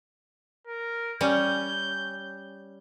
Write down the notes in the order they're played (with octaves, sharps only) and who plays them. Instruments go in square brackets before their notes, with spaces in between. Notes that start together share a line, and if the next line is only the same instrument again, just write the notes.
[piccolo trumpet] A#4
[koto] G3 C#4 [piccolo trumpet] G6